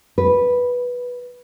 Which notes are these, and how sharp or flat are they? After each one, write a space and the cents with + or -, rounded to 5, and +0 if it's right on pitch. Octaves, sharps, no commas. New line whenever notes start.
B4 -10